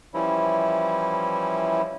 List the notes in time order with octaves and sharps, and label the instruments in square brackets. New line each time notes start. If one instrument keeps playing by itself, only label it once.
[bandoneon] E3 F3 G3 C#4 E4